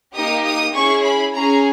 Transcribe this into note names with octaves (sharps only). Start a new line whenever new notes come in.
A#3 D#4 G4 D#6
D#6
C#4 E4 G#4 C#6
B5
C#4 G#4 A#5